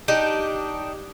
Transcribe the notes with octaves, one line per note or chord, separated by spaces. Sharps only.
D4 D#4 G4